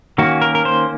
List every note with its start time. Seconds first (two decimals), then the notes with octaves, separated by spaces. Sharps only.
0.18 D#3 A#3 C#4 F#4
0.41 A#4
0.55 A#4
0.65 C5